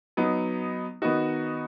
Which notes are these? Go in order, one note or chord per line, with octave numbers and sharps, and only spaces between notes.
F#3 B3 D#4
D#3 B3 D#4 F#4